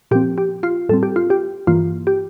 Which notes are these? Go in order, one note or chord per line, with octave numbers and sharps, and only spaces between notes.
A#2 F3 C4 G4
G4
F4
A2 G3 C4 A4
G4
F4
G4
G2 E3 A#3 F4
G4